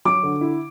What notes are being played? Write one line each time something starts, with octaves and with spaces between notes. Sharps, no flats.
F#3 D6
D3
E4